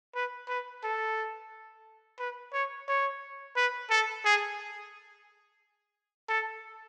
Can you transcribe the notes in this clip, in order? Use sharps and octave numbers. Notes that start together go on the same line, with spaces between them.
B4
B4
A4
B4
C#5
C#5
B4
A4
G#4
A4